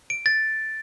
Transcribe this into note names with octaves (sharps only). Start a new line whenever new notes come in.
D7
A6